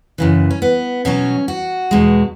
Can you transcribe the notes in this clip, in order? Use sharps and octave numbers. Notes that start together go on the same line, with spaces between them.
F#2 C#3 E3
C#4
B3
B2 F#3 C#4
F#4
E2 B2 G#3